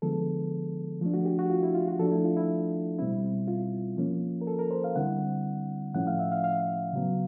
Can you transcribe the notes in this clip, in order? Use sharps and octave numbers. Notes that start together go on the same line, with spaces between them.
D3 F3 G#3 B3 A4
F3 A3 D4
F#4
G4
F#4
F4
E4
F4
F#4
F3 A3 D4 A4
E4
F4
E4
B2 G3 C4 E4
F4
F3 A#3 C#4
A#4
A4
A#4
C5
F5
D3 G3 C4 E4 F#5
A2 F3 A3 C#4 E4 F#5
F5
E5
F5
F5
C#3 F#3 B3